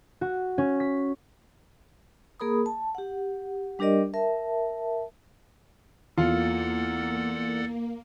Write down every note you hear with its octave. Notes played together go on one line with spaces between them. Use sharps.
F#4
C#4
B6
A#3 G#4 A#4 B5 D#6
A5
G4 F#5
G3 D4 G4 A#4 D5 D#5
A#4 E5 A5
E2 A#3 F4 A4 D5 F#5